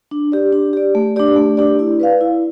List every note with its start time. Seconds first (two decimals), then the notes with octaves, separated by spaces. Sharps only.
0.11 D4
0.32 G4 D5
0.52 D4
0.73 G4 D5
0.95 A3
1.16 D4 G4 D5
1.36 A3
1.57 D4 G4 D5
1.79 E4
2.00 B4 D5 F5
2.21 E4